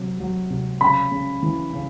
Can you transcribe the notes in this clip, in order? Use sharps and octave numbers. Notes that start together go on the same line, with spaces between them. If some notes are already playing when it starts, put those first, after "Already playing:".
Already playing: C3 F#3
F#3
C3
C#3 B5
C#3
E3
C#3